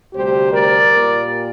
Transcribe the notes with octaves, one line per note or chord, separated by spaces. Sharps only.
D2 C3 G3 G4 C5
A#4 D5
A#2 G3